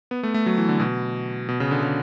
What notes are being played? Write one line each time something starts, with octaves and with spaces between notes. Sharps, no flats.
B3
A3
A3
F#3
E3
D3
B2
B2
C#3
D3
C#3